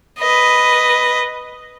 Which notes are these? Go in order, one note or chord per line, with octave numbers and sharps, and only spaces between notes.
B4 D#5